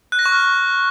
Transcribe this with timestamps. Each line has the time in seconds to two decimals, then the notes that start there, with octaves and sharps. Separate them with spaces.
0.12 F#6
0.19 A#6
0.26 C#6
0.32 F6